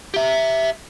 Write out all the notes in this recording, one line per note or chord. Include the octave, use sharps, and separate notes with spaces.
G4 E5